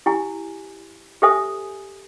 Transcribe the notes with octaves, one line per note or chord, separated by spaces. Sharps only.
E4 G4 G#5
G4 A4 C5 E5 G#5 D#6